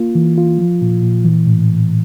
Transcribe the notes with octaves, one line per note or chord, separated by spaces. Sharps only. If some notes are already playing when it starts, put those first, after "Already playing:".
Already playing: A#3 F4
E3
F4
F3
A#2
A#2
E3
A2